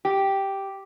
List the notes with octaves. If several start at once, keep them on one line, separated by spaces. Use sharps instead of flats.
G4